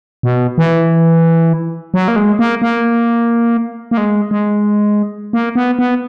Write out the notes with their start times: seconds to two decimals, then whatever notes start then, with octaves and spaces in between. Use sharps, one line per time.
0.23 B2
0.58 E3
1.94 F#3
2.08 A#3
2.16 G#3
2.39 A#3
2.62 A#3
3.91 A#3
3.97 G#3
4.31 G#3
5.33 A#3
5.55 B3
5.79 B3